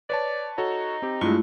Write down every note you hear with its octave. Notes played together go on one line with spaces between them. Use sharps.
B4 C#5 D5 A5
D#4 F#4 A4 C#5
C4 G4
G2 G#3 A3 E4 F4